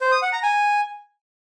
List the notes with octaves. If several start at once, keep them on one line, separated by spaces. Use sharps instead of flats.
C5
D#6
F#5
A#5
G#5